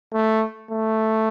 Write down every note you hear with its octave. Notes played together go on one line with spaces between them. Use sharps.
A3
A3